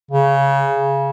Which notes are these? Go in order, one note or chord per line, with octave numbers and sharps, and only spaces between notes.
C#3